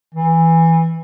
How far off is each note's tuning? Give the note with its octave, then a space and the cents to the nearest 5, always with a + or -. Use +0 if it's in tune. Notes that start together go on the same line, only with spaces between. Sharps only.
E3 -5